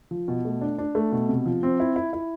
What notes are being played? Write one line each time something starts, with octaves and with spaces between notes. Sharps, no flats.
F3
B2
A3
D4
D4
A3
B2
C3
F3
C4
E4
E4
E4